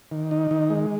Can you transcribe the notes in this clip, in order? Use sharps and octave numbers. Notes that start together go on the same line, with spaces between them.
D#3
D#4
D#3
G#3